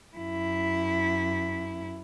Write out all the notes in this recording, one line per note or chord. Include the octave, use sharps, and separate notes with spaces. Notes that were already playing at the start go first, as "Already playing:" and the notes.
F#2 E4